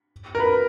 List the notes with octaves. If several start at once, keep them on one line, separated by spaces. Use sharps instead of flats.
A#4
B4